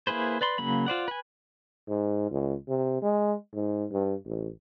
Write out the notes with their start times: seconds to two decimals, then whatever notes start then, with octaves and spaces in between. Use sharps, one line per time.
0.07 A#3 E4 G#4 B4 C5
0.41 B4 D5 B5 C6
0.58 C#3 F#3 A#3 B5
0.86 F4 C5 D5 F#5
1.08 B4 G#5
1.88 G#2
2.31 C#2
2.68 C3
3.02 G#3
3.54 G#2
3.92 G2
4.26 A1